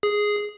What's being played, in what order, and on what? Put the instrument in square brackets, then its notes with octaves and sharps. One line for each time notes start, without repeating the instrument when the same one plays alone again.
[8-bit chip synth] G#4